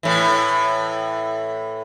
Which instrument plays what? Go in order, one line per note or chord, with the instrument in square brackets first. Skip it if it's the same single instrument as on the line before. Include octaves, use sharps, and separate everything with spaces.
[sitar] A2 E3